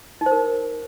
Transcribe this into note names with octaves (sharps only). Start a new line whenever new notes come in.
D#4
C5
A#4